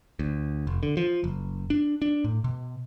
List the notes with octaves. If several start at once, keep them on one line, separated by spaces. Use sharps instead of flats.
D2
F1
D3
F3
F#1
D4
D4
A2
B2